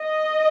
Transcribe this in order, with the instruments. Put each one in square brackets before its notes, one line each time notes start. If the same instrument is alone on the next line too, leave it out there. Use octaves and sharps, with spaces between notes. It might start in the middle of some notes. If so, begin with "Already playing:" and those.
Already playing: [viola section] D#5